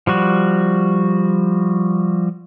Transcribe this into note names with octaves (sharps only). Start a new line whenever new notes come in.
F3 G3 F#4